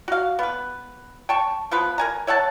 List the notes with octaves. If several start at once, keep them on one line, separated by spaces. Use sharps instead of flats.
F#4 F5
B3 B4
G5 A5 C#6
F3 B3 B4
A#4 G#5 A#5
C#5 E5 F#5 A5